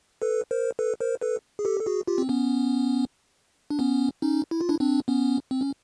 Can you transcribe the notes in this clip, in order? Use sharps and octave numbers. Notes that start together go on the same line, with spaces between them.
A4 B4
A#4 C5
A4 B4
A#4 C5
A4 B4
G#4
G4 A4
A4
F#4 G#4
F4 G4
C4
B3 C#4
D4
B3 C#4
C#4 D#4
E4
F4
D4 E4
C4 D4
B3 C#4
C4
C#4